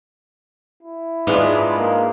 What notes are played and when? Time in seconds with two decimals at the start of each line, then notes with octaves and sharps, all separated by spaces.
0.83 E4
1.27 G#2 G#3 B3 D4 F4
1.77 A#3